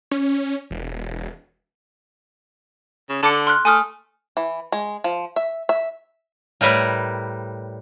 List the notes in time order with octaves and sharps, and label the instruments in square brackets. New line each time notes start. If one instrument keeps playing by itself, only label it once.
[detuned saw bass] C#4
E1
[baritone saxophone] C#3
[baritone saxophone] D3 [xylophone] A5 D6 C#7
[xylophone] C6 F6 F#6
[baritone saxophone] A3 [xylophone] G#5 D#6 F6
[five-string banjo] E3
G#3
F3
E5
E5
[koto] A2 G3 A#4 B4